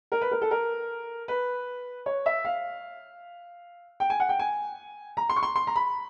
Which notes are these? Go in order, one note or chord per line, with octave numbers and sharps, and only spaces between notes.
A#4
B4
A#4
A4
A#4
B4
C#5
E5
F5
G5
G#5
F#5
G5
G#5
A#5
C6
C#6
C6
C6
A#5
B5